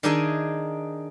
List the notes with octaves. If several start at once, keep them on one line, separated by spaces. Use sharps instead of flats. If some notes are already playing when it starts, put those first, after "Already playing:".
D#3 D4 D#4 G#4 E5 G#5